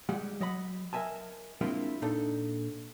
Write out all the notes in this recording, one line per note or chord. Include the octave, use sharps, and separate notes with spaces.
G3 G#3 F#5
F#3 D#5 F#5 B5
A#4 D#5 E5 G#5 A5
G#3 A#3 C4 D4 E4 F4
A#2 D4 D#4 A4 A5